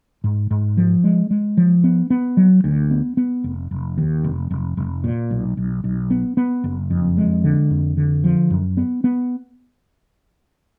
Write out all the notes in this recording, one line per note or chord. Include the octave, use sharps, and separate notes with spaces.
G#2
G#2
F3
G#3
G#3
F3
B3
B3
F#3
D2
B3
B3
F1
F1
D#2
F1
F1
F1
A#2
B1
B1
B1
B3
B3
F#1
F2
G#3
D3
F2
D3
F3
F#2
B3
B3